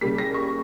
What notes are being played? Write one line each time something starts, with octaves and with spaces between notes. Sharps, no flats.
C#3 G3 A#3 B6
A#6
C#6